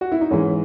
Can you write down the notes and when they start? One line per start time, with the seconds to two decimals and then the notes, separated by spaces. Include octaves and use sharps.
0.01 F#4
0.12 E4
0.21 D#4
0.31 G#2 E3 G#3 C#4